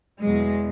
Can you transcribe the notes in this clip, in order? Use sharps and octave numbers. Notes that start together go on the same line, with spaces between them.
E2 B2 F#3 G#3